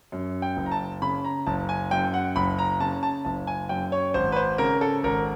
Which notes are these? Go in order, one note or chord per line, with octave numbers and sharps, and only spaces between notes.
F#2
G5
F#1
A#5
A5
C#3 B5
A#5
F#1 A5
G#5
F#2 G5
F#5
F#1 B5
A#5
C#3 A5
A5
F#1 A5
G#5
F#2 G5
C#5
G#1 C5
B4
C5
C#3 A#4
A4
G#1 A#4